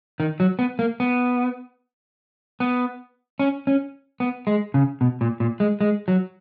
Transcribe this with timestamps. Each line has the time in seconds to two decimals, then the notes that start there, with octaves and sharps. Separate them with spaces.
0.20 D#3
0.40 F#3
0.59 B3
0.79 A#3
1.00 B3
2.60 B3
3.39 C#4
3.67 C#4
4.20 B3
4.47 G#3
4.74 C#3
5.01 B2
5.21 A#2
5.40 A#2
5.60 G#3
5.81 G#3
6.08 F#3